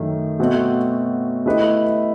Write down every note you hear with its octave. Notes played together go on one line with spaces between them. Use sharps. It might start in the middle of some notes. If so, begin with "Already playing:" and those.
Already playing: F#2 D#3 A3
B2 A3 C4 F#4
A3 E4 G4 B4 D#5